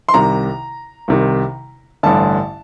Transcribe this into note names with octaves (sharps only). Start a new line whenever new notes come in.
C6
C2 C3 D#3 A#5
C2 C3 D#3
A1 G2 D3 A5